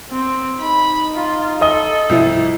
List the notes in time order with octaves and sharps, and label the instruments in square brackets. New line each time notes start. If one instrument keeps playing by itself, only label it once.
[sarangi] C4
[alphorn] D#4 [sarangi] B5
[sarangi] F4
[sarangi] A4 [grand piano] D#5 D#6 G7
[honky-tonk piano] C2 F3 E4